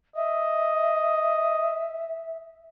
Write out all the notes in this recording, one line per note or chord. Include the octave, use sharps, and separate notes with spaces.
D#5 E5